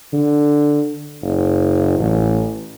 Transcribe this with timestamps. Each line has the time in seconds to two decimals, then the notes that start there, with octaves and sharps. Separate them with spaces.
0.13 D3
1.22 F#1
1.98 A1